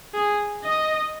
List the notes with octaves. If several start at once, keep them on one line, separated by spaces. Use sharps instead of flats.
G#4
D#5